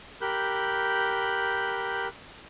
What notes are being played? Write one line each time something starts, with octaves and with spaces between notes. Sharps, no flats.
G4 A#4 B5 F#6 G6